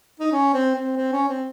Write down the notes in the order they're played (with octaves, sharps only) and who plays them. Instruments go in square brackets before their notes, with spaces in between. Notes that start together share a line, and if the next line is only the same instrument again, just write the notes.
[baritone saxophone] D#4
C#4
C4
C4
C4
C#4
C4